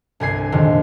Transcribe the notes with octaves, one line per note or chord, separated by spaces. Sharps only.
G1 C2 G#5 C7
F2 A#2 D3 D#3 F#3 G#3